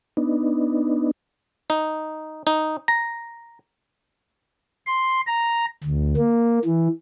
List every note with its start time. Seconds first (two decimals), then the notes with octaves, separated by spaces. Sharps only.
0.17 B3 D4 D#4
1.70 D#4
2.47 D#4
2.88 A#5
4.86 C6
5.27 A#5
5.84 D2
6.16 A#3
6.65 E3